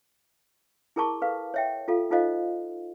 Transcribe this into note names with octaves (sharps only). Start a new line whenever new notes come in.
E4 G#4 A#4 A5 C#6 D6
A4 B4 F5
C#5 E5 G5
F4 A4 F5
D#4 F4 A4 C5 D#5 F5